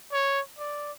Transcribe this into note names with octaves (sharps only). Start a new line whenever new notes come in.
C#5
D5